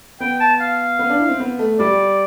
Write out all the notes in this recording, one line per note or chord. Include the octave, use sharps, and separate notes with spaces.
B3 G5
A5
F5
B3
D4
E4
C4
B3
A3
G3 D5